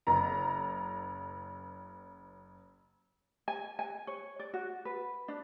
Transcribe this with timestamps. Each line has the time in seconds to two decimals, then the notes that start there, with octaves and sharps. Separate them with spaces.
0.07 F#1 A#5
3.48 G#5
3.79 G#5
4.07 C#5
4.39 D5
4.54 F#4
4.85 B4
5.28 D4